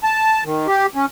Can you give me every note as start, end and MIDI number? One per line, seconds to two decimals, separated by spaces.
0.03 0.44 81
0.45 0.67 51
0.67 0.86 67
0.95 1.06 61